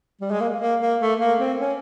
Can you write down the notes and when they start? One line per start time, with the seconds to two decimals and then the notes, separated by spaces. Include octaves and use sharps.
0.21 G3
0.31 G#3
0.41 A#3
0.61 A#3
0.81 A#3
1.01 A3
1.19 A#3
1.40 C4
1.59 C#4